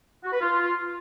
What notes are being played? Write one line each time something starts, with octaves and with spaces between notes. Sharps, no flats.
F#4
B4
F4